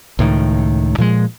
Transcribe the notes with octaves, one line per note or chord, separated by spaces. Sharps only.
C#2 A2 D#3
A#2 F3 G#3